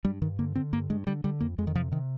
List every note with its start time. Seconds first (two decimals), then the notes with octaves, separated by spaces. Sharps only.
0.05 G2 G3
0.22 G2 D#3
0.39 D3 A#3
0.55 D3 C4
0.73 G2 A#3
0.90 G2 G#3
1.07 D3 G3
1.24 D3 G3
1.41 F2 A#3
1.58 F2 G#3
1.67 D#3
1.75 C3 F3
1.92 C3 D#3